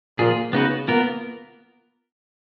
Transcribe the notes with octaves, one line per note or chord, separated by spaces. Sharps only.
A#2 F3 A#3 F4 G#4
C#3 B3 D#4 F#4 B4
A#3 B3 F4 A#4